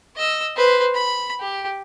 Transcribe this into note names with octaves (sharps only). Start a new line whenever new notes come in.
D#5 E6
B4 C5
B5
G4